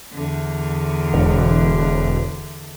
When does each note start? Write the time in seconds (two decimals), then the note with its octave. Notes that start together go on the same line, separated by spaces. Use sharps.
0.12 E2 D3
1.13 E1